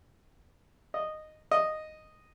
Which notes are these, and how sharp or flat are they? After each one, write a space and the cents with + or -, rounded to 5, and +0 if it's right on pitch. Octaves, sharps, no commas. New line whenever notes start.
D#5 -10
D#5 -5